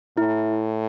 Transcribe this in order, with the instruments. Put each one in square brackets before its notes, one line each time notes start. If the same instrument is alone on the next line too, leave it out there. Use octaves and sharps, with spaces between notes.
[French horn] A2 [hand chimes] E4